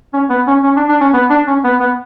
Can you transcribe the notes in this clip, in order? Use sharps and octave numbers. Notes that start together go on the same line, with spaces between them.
C#4
B3
C#4
C#4
D4
D4
C#4
B3
D4
C#4
B3
B3